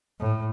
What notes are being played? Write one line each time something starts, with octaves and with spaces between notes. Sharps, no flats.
A2